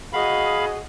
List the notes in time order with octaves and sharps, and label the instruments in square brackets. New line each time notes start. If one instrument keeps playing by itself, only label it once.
[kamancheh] F#4 D#5 [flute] G#4 [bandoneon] F5 B5